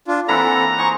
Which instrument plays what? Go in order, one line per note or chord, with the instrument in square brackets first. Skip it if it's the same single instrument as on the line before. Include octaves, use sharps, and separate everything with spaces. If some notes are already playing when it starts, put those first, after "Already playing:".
[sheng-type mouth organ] D4 F4
[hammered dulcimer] E3 A#3 E4 [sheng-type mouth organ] C4 A4 F#5 [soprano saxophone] A#5
[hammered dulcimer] D#4 G#4 C5 [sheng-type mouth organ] C#6